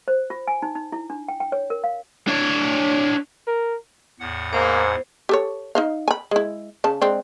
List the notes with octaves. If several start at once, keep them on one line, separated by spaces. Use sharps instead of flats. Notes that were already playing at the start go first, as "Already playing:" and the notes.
C5
F4
G#5
D#4
D#4
E4
D4
G5
G5
C#5
A#4
F5
D4 C#5
A#4
E2 A2 F#5
G#2 A#3 C5
G4 A4 C#5
D#4 D#5 F5
G#5 B5
G#3 E4
C#3 A5
G#3 C4 D4